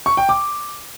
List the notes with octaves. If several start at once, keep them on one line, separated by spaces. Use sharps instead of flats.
C#6
G5
D6